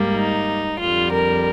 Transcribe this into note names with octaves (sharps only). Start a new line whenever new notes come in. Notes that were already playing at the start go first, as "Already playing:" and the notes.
Already playing: G#2 G3 A#3
D#4
F2 D3 G3 F4
A#4